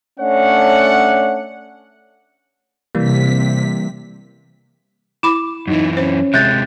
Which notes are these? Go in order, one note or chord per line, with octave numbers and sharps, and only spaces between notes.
A3 C#4 D4 C#5 F#5
C3 E3 G3 A#3 B6
E4 B5 D6 E7
F#2 E3 D#4
C#4 C5
C3 G#3 E5 F#6 G6 A6